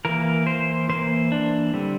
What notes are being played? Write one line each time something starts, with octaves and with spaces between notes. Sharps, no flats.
E3 A#3 A#4
C5
E3 A#3 C5
D4
D3 G3 C4